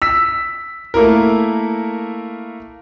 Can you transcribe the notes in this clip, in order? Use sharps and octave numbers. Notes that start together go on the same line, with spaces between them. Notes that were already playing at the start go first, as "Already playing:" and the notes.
E6 B6
A3 A#3 E4 A#4